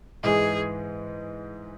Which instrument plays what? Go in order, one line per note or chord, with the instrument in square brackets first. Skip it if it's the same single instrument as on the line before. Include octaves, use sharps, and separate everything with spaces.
[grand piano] G#2 E3 G#3 [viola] G#4